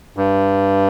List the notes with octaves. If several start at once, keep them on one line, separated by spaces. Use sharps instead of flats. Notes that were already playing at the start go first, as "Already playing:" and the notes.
G2